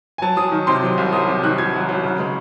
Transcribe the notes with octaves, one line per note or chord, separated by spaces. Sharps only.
G#5
F#3 A5
F#3 D#6
D#3
C3 C6
F#3
C2
F#3 D#6
C3
D#3 F#6
F#3 G#6
F#3
F#3
C#3
G#3